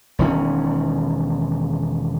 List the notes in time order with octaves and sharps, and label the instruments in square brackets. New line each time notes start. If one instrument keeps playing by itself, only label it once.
[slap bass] E1 D#3 C#4